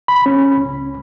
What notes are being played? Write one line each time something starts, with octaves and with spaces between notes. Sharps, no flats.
B5
C#4
C#2